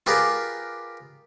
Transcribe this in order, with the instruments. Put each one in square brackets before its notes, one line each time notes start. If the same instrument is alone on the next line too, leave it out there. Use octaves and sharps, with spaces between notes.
[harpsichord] F4 G4 G#4 A#4 B4 D5